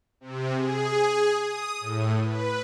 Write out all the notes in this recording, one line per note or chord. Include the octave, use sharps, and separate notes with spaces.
C3
G#4
D#6
A2
B4